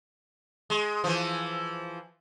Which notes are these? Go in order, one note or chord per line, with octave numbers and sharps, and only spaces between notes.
G#3
E3 F3